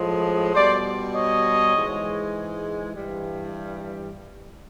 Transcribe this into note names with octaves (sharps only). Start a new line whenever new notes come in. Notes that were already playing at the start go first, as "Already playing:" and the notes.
Already playing: A2 F3 G#3
B2 G3 C5 D5
C#5 D#5
G#2 E3 G#3
G2 E3 G3